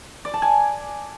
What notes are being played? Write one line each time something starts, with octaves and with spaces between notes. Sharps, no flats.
D5
A5
G#5